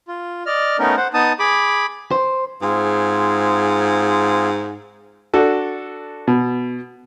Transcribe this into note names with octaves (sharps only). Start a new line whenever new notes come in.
F4
D5 D#5 F6
A3 B3 C#4 D#4 A#4
C5 F#5
B3 D#4 A5 D#6
G#4 B5 D6
C5
G#2 C4 F4 G#4
D4 F#4 A4
B2